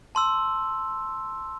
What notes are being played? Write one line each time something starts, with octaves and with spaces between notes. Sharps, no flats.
A5 C6 E6